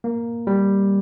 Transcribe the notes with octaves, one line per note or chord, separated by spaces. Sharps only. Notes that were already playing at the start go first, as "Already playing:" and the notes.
A#3
G3